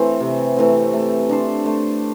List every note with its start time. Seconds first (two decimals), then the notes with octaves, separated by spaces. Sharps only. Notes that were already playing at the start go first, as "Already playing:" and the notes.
Already playing: E3 A3 C4
0.20 C3
0.56 E3 A3 C4
0.93 A3
1.29 D4 A4 C5
1.66 A3